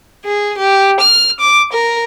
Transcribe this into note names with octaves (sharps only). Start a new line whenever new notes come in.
G#4
G4
F6
D6
A#4